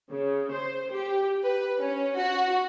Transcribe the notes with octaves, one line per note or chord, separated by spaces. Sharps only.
C#3
C5
G4
B4
C#4
F#4